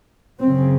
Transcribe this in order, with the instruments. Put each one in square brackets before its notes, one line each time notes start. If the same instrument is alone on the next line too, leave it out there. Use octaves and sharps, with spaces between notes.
[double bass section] F#2 C#3 C4